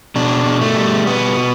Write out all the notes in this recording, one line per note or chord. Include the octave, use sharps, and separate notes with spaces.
B2 D4
B2
A3
G3
B2 B3
B2